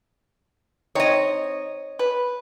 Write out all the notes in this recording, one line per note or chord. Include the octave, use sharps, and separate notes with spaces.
C4 D#4 C#5 D#5
B4